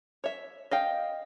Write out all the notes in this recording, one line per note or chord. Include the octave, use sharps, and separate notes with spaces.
C#5 E5
D#5 F5 G5